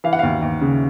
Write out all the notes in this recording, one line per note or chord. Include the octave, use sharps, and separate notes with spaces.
E3 F5
F#5
D#2 F5
D#2
C#3